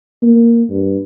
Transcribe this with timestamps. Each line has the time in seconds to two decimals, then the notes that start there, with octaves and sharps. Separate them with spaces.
0.22 A#3
0.70 G2